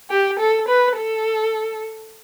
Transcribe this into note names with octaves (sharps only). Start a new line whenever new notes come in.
G4
A4
B4
A4